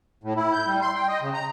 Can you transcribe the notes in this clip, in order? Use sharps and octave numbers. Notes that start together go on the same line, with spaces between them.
A2
E4
G6
G3
C6
G5
D#5
C#3
A#5